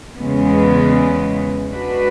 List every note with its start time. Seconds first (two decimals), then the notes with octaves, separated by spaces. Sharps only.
0.17 E2 C#3 G#3 B3
1.71 G#3 D4 F#4 B4